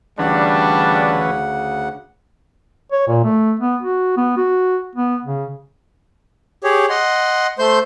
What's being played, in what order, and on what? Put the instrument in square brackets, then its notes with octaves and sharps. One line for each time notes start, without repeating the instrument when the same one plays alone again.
[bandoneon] D2 C#3 F#5 [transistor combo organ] E3 C#4 B4 [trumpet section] G3 D4
[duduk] C#5
A#2
A3
B3
F#4
B3
F#4
B3
C#3
[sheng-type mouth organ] G4 G#4 C#5
D#5 F#5 C6
A3 C5 C6 G6